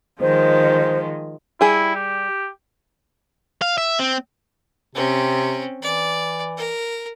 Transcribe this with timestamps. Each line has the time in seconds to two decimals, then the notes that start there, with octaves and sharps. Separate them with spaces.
0.21 D#3 F3 G#3 C5
1.61 G3 E4 G#4
1.95 G4
3.62 F5
3.78 E5
3.99 C4
4.95 C3 C4 C#4
5.83 E3 D5
6.57 A#4